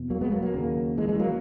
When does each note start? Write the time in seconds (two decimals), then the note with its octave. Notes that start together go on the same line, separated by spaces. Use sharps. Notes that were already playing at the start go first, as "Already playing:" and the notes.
Already playing: E2 B2
0.10 F#3 A#3
0.21 G#3 B3
0.32 F#3 A#3
0.42 F#3 A#3
0.54 D#2 C#3
0.97 E3 G#3
1.09 E3 G#3
1.19 F#3 A#3